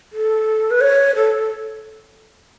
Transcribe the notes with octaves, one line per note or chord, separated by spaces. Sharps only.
A4
B4
C#5
A4